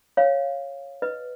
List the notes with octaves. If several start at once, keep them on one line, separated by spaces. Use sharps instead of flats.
C#5 F5
B4 D#5